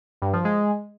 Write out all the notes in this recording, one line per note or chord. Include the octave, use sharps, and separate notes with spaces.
G2
F3
G#3